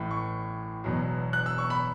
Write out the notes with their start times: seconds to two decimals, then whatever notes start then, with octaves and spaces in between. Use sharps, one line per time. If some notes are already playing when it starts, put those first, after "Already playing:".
Already playing: A1 A2 E3
0.11 C#6
0.84 E1 E2 B2 F#3
1.33 F#6
1.46 E6
1.58 C#6
1.70 B5